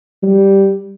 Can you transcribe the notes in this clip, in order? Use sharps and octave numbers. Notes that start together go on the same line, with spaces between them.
G3